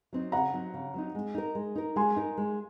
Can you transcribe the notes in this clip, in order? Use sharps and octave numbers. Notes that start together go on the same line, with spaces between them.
F#3 C4 D#4
C#3 F#5 A#5
F#3 C4 D#4
C#3
F#3 C4 D#4
G#3
D#4 A#4
G#3
D#4 A#4
G#3 G#5 C6
D#4 A#4
G#3